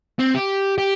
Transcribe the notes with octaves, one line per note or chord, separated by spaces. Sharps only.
C4
G4
G4